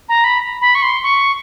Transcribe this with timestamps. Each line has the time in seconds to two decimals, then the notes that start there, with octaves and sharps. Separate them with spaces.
0.09 A#5
0.24 B5
0.61 B5
0.75 C#6
0.83 C6
1.03 C#6